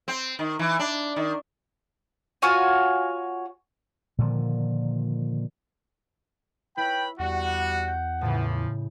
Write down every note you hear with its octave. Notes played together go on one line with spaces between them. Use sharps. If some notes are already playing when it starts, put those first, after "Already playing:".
C4
D#3
E3
D4
D#3
F4 F#4 C#5 G#5
A#2 D3 D#3 F3
E4 B4 C#5 G5 B5
E2 G3 F#4 F#5
G6
A2 C#3 E3 F3